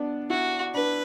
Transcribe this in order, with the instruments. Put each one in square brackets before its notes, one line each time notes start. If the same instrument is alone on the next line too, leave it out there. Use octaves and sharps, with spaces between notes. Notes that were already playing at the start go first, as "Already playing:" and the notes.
Already playing: [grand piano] B3 D4
[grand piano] E4 [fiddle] F#4
[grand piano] D4 [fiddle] B4